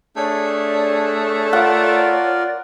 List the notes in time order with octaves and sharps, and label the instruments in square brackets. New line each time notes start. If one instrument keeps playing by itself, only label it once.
[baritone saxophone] A3 [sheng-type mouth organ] D4 G#4 [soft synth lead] C#5
[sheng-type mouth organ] F4 A#4 D5 [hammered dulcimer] F#5